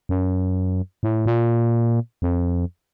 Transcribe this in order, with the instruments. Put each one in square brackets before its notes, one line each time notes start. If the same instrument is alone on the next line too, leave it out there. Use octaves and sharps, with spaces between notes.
[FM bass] F#2
A2
A#2
F2